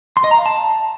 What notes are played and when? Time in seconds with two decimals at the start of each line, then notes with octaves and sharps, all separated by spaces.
0.17 C6
0.24 D#5
0.31 A#5
0.38 F5
0.46 A5